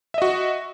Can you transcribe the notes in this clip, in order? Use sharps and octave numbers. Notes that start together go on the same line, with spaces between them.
F#4 D#5 E5